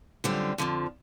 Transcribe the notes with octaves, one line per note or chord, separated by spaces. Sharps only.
F#2 D3 G3 C4 F4
F2 D3 F3